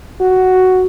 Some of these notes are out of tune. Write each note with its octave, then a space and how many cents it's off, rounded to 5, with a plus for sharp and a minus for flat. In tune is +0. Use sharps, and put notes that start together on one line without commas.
F#4 +5